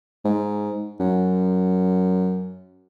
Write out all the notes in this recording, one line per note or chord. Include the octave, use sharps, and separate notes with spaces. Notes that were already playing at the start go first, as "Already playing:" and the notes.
G#2
F#2